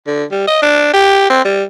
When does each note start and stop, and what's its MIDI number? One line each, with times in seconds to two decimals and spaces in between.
0.07 0.25 50
0.31 0.42 55
0.48 0.61 75
0.62 0.90 62
0.94 1.30 67
1.30 1.44 60
1.45 1.63 55